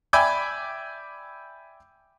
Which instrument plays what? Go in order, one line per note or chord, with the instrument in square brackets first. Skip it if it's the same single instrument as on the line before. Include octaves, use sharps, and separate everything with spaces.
[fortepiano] D5 E5 G5 G#5 B5 D6